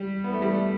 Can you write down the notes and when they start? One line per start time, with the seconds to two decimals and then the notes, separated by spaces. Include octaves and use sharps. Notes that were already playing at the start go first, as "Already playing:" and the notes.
Already playing: G3
0.24 B3
0.33 A3
0.42 G3
0.51 A3